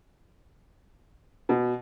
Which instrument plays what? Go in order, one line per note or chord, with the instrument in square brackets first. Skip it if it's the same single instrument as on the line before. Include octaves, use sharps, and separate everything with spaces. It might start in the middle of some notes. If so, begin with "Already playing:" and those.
[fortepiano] B2